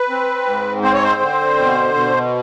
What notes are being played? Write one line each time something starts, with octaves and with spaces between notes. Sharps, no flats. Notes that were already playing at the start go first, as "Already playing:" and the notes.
Already playing: B4
C4
G#2
C4 C5
C#5
C5
D3
B2
B2